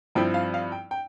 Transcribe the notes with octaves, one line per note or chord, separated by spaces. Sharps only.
G2 F3 C4 E4 G5
F5
F5
G5
G5